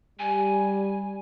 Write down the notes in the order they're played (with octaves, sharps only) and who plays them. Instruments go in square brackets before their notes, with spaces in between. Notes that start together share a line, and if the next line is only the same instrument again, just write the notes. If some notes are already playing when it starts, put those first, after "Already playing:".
[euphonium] G3 [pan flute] G#5